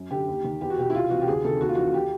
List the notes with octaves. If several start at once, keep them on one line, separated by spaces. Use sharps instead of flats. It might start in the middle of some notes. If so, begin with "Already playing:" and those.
Already playing: F#2
D3 G4
D#2
D#3
E2 G4
F#4
B2 G4
E4
C2 F4
C3 E3 F#4
G4
D2 G#4
C3 D#3 A4
D#2 F#4
F4
C#3 E3 F#4
G4